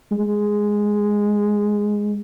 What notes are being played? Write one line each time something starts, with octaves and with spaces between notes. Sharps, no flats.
G#3